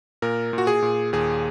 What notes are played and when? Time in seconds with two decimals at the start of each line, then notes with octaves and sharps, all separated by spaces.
0.22 A#2 A#4
0.53 A#2
0.58 F#4
0.67 G#4
0.82 A#2
1.13 D#2 G#4